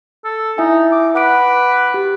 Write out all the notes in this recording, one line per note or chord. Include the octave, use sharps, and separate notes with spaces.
A4
D#4 E4 E5 G#5
D6
B4 F#5 D6 D7
G4